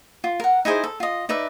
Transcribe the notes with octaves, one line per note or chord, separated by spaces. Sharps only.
F4
A#4 F#5
D#4 E4 G#4 C5
A4
F4 D#5
D#4 B4 D5 E5